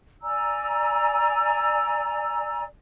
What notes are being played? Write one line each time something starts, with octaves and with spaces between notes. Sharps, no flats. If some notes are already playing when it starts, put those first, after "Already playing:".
D5 G#5 A#5 E6